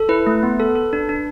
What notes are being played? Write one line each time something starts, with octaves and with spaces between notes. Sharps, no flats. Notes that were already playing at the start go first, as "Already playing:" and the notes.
Already playing: A4
E4 B4
A3
B3
A4
A4
D4
D4